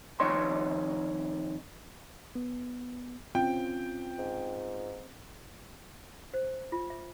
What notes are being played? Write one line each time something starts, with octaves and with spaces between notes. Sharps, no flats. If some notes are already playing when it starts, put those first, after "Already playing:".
C2 D#3 F3 C#5 D#5 C6
B3
C4 C#4 F4 G5
G#2
C5
F4
E5